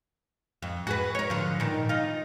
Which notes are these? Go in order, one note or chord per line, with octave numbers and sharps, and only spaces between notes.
F2
F#4 G#4 B4
A#4 C#5
D3 F3
A#2 D#3
D#4 F4